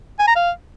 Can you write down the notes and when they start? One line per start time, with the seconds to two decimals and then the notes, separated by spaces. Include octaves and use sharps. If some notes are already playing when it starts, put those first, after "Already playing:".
0.19 G#5
0.28 A#5
0.36 F5